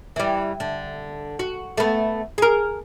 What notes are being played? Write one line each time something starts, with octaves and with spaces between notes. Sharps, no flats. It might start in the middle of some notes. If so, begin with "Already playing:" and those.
E3 G3
D3
F#4
A3 B3
G#4 A#4